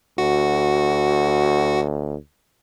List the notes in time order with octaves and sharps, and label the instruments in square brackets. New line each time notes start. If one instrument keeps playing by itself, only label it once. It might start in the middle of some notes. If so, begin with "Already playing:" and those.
[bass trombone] D2 [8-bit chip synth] F#4